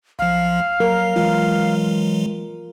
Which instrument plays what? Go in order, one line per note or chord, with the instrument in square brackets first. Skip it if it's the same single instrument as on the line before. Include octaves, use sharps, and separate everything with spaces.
[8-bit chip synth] B1 F3 [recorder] F5
[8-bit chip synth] F#3 [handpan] A#4
[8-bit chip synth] E3 F#3 G#3 [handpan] F4